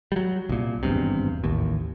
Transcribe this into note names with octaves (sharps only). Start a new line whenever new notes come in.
F#3 G3
C2 A#2
G#1 E2 G2 C3
A1 D#2